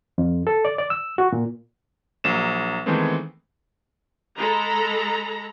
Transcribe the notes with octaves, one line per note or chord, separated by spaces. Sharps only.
F2
A4
D5
D5
E6
F#4
A#2
A#1 F#3 A#3 E7
D#3 E3 G#3 A3 B3 C4
G#3 A4 A#5 B5